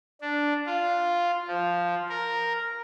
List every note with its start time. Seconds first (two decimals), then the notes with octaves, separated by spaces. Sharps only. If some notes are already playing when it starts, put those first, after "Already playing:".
0.21 D4
0.66 F4
1.48 F3
2.09 A#4